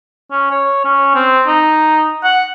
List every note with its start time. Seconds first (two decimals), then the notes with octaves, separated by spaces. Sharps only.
0.31 C#4
0.51 C#5
0.85 C#4
1.15 C4
1.47 D#4
2.24 F#5